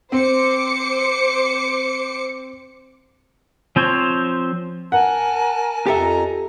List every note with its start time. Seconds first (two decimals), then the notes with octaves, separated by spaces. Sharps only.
0.12 C4 C5 D6 C#7
3.76 F3 C4 C5 C#5
4.92 A#4 F#5 G#5 A5
5.86 F2 G4 A4 E5 A#5